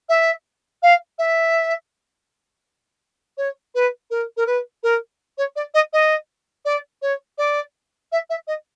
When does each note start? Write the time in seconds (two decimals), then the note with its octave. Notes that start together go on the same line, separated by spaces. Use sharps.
0.09 E5
0.82 F5
1.18 E5
3.37 C#5
3.75 B4
4.10 A#4
4.37 A#4
4.46 B4
4.83 A#4
5.38 C#5
5.56 D5
5.74 D#5
5.93 D#5
6.65 D5
7.02 C#5
7.38 D5
8.12 E5
8.30 E5
8.47 D#5